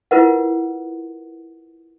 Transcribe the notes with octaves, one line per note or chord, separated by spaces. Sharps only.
E4 F4 A#4 B4 F#5